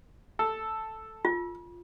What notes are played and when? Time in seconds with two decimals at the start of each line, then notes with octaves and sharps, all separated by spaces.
0.39 A4
1.25 F4